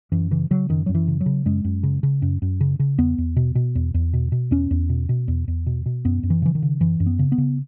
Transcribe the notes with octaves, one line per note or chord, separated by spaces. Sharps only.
F#2 E3
C#3 E3
C#3 F#3
F#2 D#3
F#2 F#3
E3
C#3
F#3
C#3
F#2 G#3
F#2
C#3
C#3
F#2
F#2
C#3
C#3
E2 B3
E2
B2
B2
E2
E2
B2
B2
E2 C#4
E2
B2
B2
E2
E2
B2
B2
F#2 B3
F#2
E3
C#3 E3
D#3
C#3
F#2 E3
F#2
B3
C#3
B3
C#3